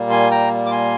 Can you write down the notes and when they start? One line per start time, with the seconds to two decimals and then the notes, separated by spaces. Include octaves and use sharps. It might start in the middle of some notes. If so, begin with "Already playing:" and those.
Already playing: A#2 G3 A#3
0.10 G#5 C6
0.31 G5 A#5
0.66 D6
0.71 G#5 C6